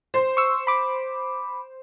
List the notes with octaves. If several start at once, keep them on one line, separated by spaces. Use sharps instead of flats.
C5
C#6 E6
B5 D6